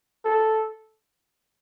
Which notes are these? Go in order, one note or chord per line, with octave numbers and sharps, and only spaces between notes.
A4